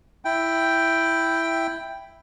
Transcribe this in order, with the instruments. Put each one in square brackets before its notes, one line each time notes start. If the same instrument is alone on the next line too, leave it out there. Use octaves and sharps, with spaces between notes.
[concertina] E4 G5